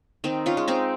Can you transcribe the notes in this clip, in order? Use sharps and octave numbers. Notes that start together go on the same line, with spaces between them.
D#3 C4 D#4
C#4 F4
G#3
C4 D#4